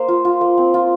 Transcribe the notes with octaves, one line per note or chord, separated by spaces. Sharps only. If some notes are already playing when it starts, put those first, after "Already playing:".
Already playing: A#3 C5
F4
F4
A#3
C4
F4